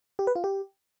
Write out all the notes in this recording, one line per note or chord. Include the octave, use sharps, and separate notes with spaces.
G4
B4
F4
G4